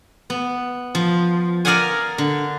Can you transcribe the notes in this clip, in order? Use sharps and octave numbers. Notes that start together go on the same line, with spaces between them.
B3
F3
A#4 D5 D#5 F5 F#5 G#5
D3